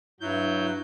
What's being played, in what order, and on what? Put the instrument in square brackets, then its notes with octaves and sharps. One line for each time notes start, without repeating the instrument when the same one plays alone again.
[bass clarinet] G2 [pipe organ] F#3 G6 [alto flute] E4